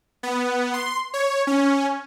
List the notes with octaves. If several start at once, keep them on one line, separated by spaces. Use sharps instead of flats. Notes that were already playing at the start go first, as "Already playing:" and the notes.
B3
C6
C#5
C#4